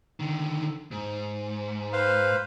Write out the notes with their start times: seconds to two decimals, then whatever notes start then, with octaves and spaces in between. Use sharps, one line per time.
0.20 D3 D#3
0.91 G#2
1.93 B4 C5 F5